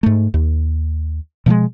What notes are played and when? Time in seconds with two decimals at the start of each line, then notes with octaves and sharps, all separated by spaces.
0.03 G#2 A3
0.34 D#2
1.46 B2 F3 F#3 G#3